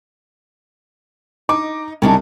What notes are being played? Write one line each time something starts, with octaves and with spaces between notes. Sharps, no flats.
D#4 D6
C2 C#3 D4 D#4